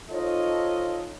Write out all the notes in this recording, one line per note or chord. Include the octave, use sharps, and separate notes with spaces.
D#4 F4 A4 C5 C#5 D#5